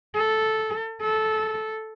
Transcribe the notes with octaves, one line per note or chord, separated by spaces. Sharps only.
A4
A4